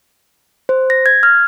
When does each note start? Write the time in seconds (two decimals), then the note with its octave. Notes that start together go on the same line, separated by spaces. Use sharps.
0.69 C5
0.90 A#6
1.06 G#6
1.23 F6